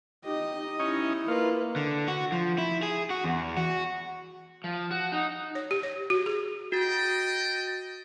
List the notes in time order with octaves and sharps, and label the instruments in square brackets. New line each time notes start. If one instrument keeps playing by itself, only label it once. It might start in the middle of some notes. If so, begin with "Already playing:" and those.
[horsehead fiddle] D#4 G4 [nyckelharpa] D#5
[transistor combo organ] C#4 D#4 [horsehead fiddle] E4
[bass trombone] A#3 [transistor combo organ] F4 [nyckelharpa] B4
[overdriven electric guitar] D3
F#4
F3
E4
G#4
F#4
E2
F#4
[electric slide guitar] F3
F#4
D#4
[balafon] C#5
G4
C#5
F#4
G#4
[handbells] F#4 [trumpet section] D#5 G5 [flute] A6